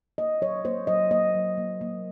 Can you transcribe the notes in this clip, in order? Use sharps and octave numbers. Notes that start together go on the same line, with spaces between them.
A#3 D#5
F#3 C#5
A#3 C5
F#3 D#5
A#3 D#5
F#3
A#3
A#3